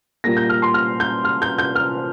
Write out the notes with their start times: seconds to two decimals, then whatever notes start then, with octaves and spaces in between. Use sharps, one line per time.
0.24 A#2 G3 A#3 A#6
0.37 G6
0.49 F6
0.62 C6
0.74 F6
1.00 G6
1.25 F6
1.42 G6
1.58 G6
1.75 F6